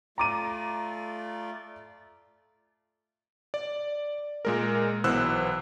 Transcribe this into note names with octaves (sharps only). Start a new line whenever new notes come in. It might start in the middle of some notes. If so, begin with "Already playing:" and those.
A3 F4 D5 A#5 D6 D#7
D5
A#2 G#3 A#4
B1 E3 B3 C5 E6 F#6